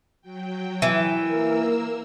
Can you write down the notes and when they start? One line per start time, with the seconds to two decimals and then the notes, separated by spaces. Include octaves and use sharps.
0.22 F#3 G5
0.82 E3
1.16 A#3 A#4 E6